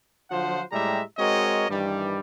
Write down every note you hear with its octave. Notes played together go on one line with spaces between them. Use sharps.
D3 F3 F#3 F4 C5 F#5
A2 G3 G#3 G4 E5 A#5
G#3 C4 F#4 A#4 C#5 D#5
G2 D#3 E3 G3